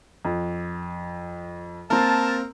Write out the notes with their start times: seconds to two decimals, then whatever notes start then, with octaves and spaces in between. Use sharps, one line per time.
0.25 F2
1.90 A#3 C4 A#4 A5